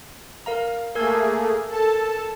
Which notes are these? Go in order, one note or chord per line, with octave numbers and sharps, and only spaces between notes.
A#4 F5 A#5
A3 A#3 G#4 A#4 E6 G#6
A4 A5